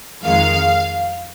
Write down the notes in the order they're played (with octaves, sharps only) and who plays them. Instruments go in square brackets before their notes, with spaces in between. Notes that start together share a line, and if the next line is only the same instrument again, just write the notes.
[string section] F2 D#3 G#3 F5